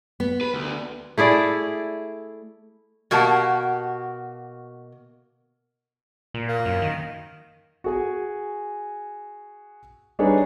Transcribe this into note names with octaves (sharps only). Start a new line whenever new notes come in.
B3
B4
D2
A3 E4 G#4 D5
B2 A#3 F#4 G4 A5
A#2
A#3
F#2
D#3
F#4 G#4 G#5
G3 D4 D#4 G#4 B4 C#5